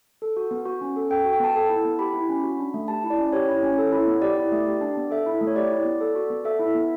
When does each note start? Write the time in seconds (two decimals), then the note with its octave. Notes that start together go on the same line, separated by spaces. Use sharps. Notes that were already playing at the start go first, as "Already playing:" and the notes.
0.22 A4
0.37 F#4
0.51 B3
0.65 F#4
0.81 C#4
0.96 A4
1.10 A4 G5
1.25 F#4
1.33 G5
1.40 B3 A5
1.56 A4
1.69 E4
1.85 B3
1.99 G4 B5
2.14 E4
2.29 C#4
2.44 F#4
2.59 D4
2.74 A3
2.88 G4 A5
3.04 E4
3.10 D5
3.18 C#4
3.33 G4 C#5
3.48 E4
3.63 C#4
3.78 A4
3.92 E4
4.07 B3
4.22 G4 D5
4.37 E4
4.52 A3
4.67 G4
4.81 D4
4.97 B3
5.11 A4 E5
5.26 E4
5.41 A3
5.47 C#5
5.56 G4 D5
5.71 E4
5.85 B3
6.00 A4
6.15 F#4
6.30 B3
6.44 A4 E5
6.59 E4
6.75 B3